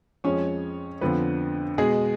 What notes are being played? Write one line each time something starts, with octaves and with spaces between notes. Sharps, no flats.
F2 F3 G#3 C#4 C#5
F2 D3 F3 B3 B4
B2 G#3 G#4